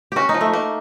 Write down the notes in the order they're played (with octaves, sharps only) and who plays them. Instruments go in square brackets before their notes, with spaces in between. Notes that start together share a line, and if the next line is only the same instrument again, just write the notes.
[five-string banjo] C#4 [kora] F#4 G4
[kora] D#4
[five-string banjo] F3
[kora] A3
[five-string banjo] A#3